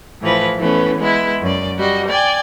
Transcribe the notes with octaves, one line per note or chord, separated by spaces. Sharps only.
A2 E3 F3 B4
E3 A3 B3 C#4
G#3 B3 E4
F#2 D5
G3 F#4 D#5
D5 G5 G#5